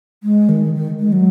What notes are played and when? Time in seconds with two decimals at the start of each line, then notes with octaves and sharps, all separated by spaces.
0.23 G#3
0.49 D#3
0.74 D#3
1.00 G#3
1.12 F#3